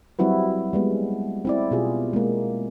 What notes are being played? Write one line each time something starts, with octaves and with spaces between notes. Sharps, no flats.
F#3 G3 C4 E4 F#4 B4
G3 G#3 B3
C4 E4 D5
B2 B3 F4 G4 G#4
G#3 A#3